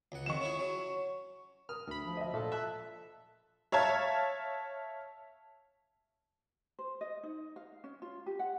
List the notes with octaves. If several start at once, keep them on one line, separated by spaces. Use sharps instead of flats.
C#2 F#5
F2 D#3 C#6 E7
C#4 E4 G#4
F#3 C#4
A#4 D#6 F6
D2 D3 B5
F3
D#5 E5
A#2 A4
E5 A5 F#6
C#5 E5 F5 A5 G#6
C5
D#5
D#4
F5
C#4
F4
G4
F#5